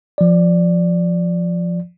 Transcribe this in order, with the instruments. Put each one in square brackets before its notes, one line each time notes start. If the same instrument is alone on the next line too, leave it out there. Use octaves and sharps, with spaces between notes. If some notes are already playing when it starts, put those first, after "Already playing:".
[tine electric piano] F3 D5